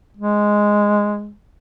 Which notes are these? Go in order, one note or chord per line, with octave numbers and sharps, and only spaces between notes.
G#3